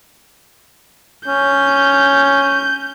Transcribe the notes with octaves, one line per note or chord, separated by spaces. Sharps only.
C#4 G6